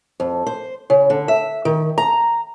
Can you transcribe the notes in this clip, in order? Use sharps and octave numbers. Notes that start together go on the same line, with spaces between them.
F2
C5
C#3
D3
E5
D#3
A#5